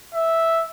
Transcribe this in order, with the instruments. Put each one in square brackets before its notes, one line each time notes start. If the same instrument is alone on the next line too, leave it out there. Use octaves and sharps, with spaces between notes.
[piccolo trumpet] E5